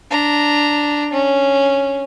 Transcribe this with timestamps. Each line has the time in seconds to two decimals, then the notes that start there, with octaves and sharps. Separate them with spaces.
0.11 D4 A#5
1.13 C#4